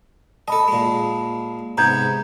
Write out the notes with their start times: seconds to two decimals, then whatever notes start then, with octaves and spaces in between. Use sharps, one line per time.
0.48 A4 D#5 A5 B5
0.68 A#2 G#3
1.78 G#2 C3 B3 A#5 G6 G#6